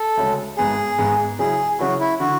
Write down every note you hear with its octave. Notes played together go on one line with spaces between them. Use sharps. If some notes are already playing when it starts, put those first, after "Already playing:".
Already playing: A4
D2 C#3 G#3 C#4
G#1 G#2 G#3 B3 G#4
G#1 G#2 G#3 B3
C#3 F#3 C#4 E4 G#4
C#3 F#3 C#4 E4 F#4
E4
D3 F#4